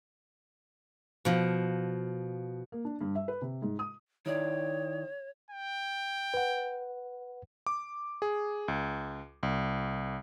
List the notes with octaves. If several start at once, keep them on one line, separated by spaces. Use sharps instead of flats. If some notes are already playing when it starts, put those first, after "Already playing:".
B2 F3
A#3
D4
G2
E5
B4
C3
G#2
D#6
D#3 E4 C#5 D5
G5
B4 F#5
D6
G#4
C#2
C2